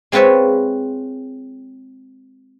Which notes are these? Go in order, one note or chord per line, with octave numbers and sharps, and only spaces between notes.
G#3 C4 F4 B4 C#5 E5